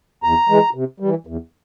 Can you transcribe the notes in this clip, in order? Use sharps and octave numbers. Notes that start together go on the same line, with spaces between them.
E2 A#5
E3 G#3
C3
E3 G3
E2